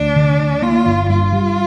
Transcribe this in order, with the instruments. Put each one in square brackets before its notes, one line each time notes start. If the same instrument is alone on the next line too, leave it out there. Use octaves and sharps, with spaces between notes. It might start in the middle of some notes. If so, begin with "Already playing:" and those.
Already playing: [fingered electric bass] D2 [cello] D4
[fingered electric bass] D3
D2
[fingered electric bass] A#3 [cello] F4
[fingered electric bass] G1
[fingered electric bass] G2 [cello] F4
[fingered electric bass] G3